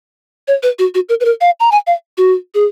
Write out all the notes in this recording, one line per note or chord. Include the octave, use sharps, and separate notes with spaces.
C#5
B4
F#4
F#4
A#4
B4
A#4
F5
A#5
G#5
F5
F#4
G#4